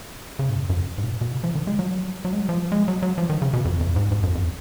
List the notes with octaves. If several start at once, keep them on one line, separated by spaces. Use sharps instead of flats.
C#3
G#2
F#2
F#2
G#2
B2
A#2
B2
C#3
F3
D#3
G#3
F#3
F#3
G#3
F#3
F3
G#3
F#3
F#3
F3
D#3
C#3
B2
F2
F2
G#2
G#2
F#2
F2